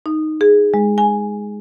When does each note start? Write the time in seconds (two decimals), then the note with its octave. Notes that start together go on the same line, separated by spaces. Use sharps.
0.06 D#4
0.41 G#4
0.74 G#3
0.98 G#5